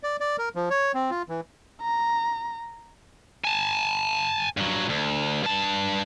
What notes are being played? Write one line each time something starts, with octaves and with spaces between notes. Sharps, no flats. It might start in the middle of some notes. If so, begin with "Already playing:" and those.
D5
D5
A#4
F3
C#5
C4
F4
E3
A#5
G#5 A5
G2 F#3
D2
G2 A5